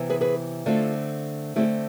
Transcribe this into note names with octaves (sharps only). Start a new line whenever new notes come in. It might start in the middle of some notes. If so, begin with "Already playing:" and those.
Already playing: C3 E3 B3
G#4 B4
G#4 B4
D3 A3 C4 F4 A4
D3 A3 C4 E4 G#4